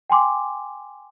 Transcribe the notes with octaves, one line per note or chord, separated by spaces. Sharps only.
G5 G#5 C6 D6